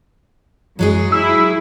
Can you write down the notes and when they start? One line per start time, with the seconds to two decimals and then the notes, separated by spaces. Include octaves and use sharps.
0.79 F#2 F#3 G#3 G#4
1.12 E4 E6